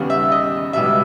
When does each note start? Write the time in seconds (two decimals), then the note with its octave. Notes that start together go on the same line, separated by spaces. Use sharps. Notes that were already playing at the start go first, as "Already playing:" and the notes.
Already playing: D#2 C#3 G3 B3
0.10 E5
0.32 D#5
0.73 C#2 B2 G3 E5